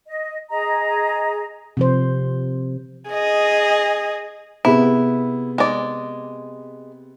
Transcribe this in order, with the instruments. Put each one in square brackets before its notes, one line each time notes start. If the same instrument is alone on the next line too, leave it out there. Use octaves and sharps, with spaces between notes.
[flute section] D#5
G#4 D#5 A#5
[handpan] C3 F3 C5
[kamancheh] G#4 D#5
[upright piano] C3 B3 G#4 [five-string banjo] E4
[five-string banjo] G#3 D5